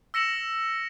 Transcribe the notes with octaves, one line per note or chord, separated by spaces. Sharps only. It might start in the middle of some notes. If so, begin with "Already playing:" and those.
E6 A#6 C#7 E7 F#7